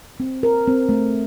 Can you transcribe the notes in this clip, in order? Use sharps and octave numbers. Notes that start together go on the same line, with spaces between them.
C4
A#4
C4
A3